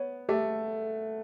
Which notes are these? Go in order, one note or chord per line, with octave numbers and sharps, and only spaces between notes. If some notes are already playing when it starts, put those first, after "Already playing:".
Already playing: B3 C#5
A3 G4